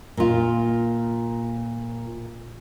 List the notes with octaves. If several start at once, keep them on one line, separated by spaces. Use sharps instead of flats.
A#2 F4